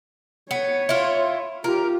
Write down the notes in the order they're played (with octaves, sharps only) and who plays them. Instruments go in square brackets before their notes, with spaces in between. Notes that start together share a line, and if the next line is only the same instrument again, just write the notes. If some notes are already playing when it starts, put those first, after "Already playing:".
[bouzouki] B3 [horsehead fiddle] C#5
[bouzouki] E4 F4
[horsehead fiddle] F4 G4 [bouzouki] A#4